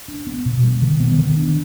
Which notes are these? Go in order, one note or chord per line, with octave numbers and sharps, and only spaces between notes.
D4
B3
B2
G3
D#3
B3
D#3
D4